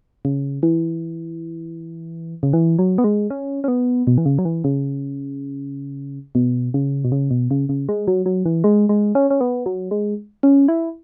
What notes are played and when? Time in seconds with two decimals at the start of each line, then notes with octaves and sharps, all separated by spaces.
0.25 C#3
0.63 E3
2.43 C#3
2.53 E3
2.79 F#3
2.98 B3
3.04 G#3
3.30 C#4
3.64 C#4
3.68 B3
4.07 B2
4.18 E3
4.26 C#3
4.39 F#3
4.45 E3
4.64 C#3
6.35 B2
6.74 C#3
7.04 B2
7.12 C#3
7.31 B2
7.51 C#3
7.69 C#3
7.89 G#3
8.08 F#3
8.26 F#3
8.45 E3
8.64 G#3
8.89 G#3
9.15 C#4
9.30 C#4
9.41 B3
9.66 F#3
9.91 G#3
10.43 C#4
10.68 E4